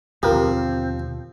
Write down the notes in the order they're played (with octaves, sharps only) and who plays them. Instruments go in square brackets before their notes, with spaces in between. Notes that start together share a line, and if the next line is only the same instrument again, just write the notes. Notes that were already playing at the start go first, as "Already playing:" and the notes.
[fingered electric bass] D#2 B2 D3 [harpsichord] F3 [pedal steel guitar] C4 [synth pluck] G4 A#4